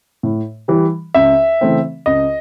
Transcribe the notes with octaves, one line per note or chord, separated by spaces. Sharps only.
A2
E3 G3
C#2 E5
C#3 E3 A3 C4
C#2 D#5